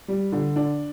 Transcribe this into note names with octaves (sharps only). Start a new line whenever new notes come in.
G3
D3
D4